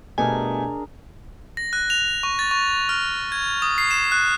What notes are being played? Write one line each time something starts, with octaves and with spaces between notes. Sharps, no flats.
B2 G3 A3 D4 G#4 A#4 G#5
A#6
F#6
F7
C#6
A6
C#6
F6
G#6
D#6
C7
E7
F#6